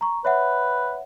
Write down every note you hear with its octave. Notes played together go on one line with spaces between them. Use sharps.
A#5 C#6
B4 C#5 E5 F#5